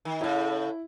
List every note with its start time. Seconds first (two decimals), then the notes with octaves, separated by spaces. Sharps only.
0.05 D#3
0.21 A2 C#3 E4